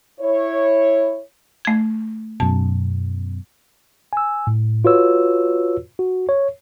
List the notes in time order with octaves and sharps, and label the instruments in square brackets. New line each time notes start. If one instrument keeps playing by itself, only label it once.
[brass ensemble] E4 C#5
[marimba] A3 G#6
[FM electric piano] F#2 B2 [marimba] A5
[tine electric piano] G#5 E6
A2
F4 F#4 B4 C#5 E6
F#4
C#5